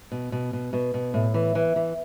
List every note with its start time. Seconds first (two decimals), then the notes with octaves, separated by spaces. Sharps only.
0.12 B2
0.32 B2
0.53 B2
0.73 B2
0.94 B2
1.14 A2
1.34 E3
1.55 E3
1.76 E3